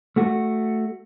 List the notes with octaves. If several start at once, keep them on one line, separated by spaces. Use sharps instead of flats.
A3 F#4